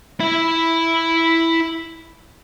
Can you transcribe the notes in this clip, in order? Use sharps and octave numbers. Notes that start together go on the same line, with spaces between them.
E4 E5